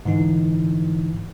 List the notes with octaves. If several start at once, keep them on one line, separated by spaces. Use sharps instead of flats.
G#2 D3 E3 D#4